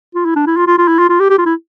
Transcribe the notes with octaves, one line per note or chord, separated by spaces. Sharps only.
F4
E4
D4
E4
F4
F4
F4
E4
F4
F4
G4
G4
F4
E4